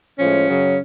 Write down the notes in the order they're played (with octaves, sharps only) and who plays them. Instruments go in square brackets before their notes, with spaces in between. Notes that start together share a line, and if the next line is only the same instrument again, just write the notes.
[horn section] A2 F3 G#3 C#4
F#2 C#3 F#3